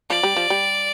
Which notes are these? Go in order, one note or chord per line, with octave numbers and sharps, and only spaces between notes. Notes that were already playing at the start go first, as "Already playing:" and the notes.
F3 D5
G3
F3
G3